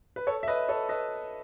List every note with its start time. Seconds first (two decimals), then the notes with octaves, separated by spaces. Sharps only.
0.16 B4
0.27 A4 C#5
0.43 E5
0.48 B4 D#5
0.69 A4 C#5
0.89 B4 D#5